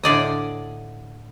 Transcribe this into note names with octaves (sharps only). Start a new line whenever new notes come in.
A2 D3 D5 D#5